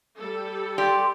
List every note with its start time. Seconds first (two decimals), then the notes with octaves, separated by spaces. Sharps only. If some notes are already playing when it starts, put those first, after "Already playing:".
0.19 G3 A4
0.78 G4 D5 C6